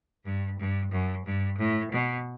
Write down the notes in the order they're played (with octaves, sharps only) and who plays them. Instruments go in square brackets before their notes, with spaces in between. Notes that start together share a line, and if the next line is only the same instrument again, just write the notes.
[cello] G2
G2
F#2
G2
A2
B2